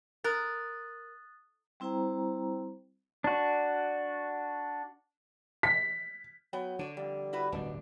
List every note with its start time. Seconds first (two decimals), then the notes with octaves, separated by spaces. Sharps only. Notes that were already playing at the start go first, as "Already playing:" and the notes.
0.24 A#4 D#6 F#6 A6
1.80 G3 C4 E4 C5 G5 A#5
3.24 D4 F#4
5.63 B6
6.53 F#3 B3 G5
6.79 D3 D4 C#5
6.97 F2 G3
7.33 E4 F#4 B4
7.52 D1 G1 B2 G3 D4